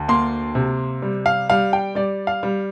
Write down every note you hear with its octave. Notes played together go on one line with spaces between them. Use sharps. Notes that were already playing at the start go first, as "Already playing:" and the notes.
Already playing: D2
A#3 C6
C3
G3
F5
G3 F5
G5
G3 D5
F5
G3